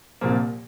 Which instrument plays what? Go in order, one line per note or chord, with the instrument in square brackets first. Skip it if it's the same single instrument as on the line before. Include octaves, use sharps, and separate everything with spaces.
[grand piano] C2 A#2 F3 A#3